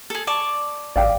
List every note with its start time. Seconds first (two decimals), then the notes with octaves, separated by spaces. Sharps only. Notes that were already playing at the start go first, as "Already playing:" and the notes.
0.10 G#4 A4
0.27 D5 A5 C#6
0.96 A1 D5 F5 G5